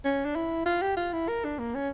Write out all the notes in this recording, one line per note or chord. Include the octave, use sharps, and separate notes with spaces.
C#4
D4
E4
F4
G4
F4
E4
A#4
D4
A#3
C#4